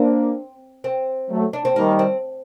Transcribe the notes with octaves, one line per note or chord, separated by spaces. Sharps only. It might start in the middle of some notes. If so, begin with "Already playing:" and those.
Already playing: A#3 C4 D4
C4
F#3 A3
D4
C4
D#3 G3 A#3
C4